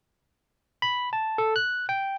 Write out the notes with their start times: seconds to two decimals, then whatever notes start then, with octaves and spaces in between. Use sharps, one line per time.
0.82 B5
1.13 A5
1.38 A4
1.56 F#6
1.89 G5